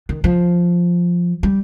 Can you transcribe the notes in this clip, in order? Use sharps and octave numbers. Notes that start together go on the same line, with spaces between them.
D#3
F3
G3